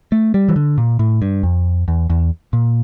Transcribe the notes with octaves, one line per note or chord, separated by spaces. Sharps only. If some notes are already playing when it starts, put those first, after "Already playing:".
A3
G3
E3
D3
A#2
A2
G2
F2
E2
E2
A#2